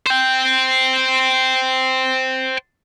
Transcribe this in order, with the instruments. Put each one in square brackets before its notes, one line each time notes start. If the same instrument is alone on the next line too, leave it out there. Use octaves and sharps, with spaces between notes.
[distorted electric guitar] C5 G5